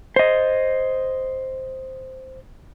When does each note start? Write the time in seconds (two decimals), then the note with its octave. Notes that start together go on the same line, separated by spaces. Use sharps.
0.16 C5 D#5